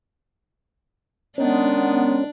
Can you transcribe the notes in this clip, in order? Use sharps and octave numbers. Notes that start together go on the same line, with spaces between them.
D#3 G#3 B3 C#4 D4